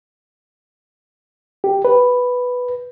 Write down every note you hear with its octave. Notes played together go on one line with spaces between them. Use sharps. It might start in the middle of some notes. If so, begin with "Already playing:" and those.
G4
B4